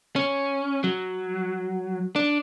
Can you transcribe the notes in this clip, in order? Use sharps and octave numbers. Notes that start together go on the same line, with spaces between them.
C#4
F#3
D4